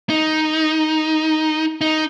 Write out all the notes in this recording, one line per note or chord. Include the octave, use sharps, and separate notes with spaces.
D#4
D#4